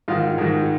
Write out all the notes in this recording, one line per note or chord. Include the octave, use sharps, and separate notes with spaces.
G#2 D#3 F4
G#2 D#3